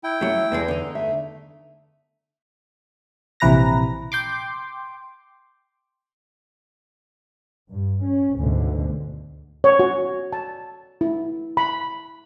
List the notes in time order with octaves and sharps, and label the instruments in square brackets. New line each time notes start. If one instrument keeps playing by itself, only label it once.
[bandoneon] E4 G5
[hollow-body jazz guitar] F#2 F#3 [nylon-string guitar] A3
[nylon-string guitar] E2 [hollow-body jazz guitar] B2 E3 G#3
[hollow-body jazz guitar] D3 D#4
[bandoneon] A3 [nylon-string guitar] E5
[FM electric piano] A#1 C3 E3 B4 A#5 A#6
G5 C6 D6
[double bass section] G2
C#4
D2 G#2 B2 D3
[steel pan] C#5
F#4
A5
E4
B5